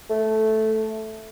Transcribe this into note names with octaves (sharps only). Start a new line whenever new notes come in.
A3